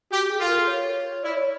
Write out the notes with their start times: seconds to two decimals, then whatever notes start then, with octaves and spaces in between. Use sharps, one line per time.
0.11 F#4 G4
0.21 G4
0.30 G#4
0.39 F4 A4
0.48 A#4
0.58 A4
0.67 C#5
1.23 E4 D5
1.37 C#5